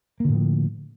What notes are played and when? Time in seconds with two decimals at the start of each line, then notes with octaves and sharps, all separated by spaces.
0.20 A#3
0.25 D3
0.29 A2
0.34 F3